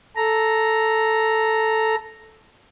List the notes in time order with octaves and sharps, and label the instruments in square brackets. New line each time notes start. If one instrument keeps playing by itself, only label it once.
[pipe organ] A4 A#5